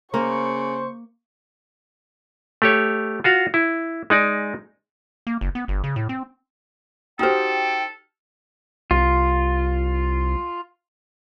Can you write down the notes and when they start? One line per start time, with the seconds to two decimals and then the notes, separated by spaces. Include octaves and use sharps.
0.14 C#3 A#3 C5 C#6
2.62 A3 G4 C#5
3.24 F4 F#4 F5
3.54 E4
4.10 G#3 D#4 D5
5.27 A#3
5.41 F#1
5.55 B3
5.68 G1
5.84 C#3
5.96 A2
6.09 C4
7.19 D#4 F#4 G4 A4 C5 G5 F6
8.91 C2 F4